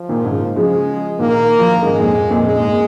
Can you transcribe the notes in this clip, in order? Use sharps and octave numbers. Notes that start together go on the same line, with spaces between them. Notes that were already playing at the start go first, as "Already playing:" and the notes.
Already playing: F3
A#2 D#3
G#2 C#3
C#3 F3 G#3
A#2 D#3 A#3
F3
D#3
G#2 C#3 G#3
F2 A#2
G#2
F2 A#2
C#3 G#3
A#2
G#2
A#2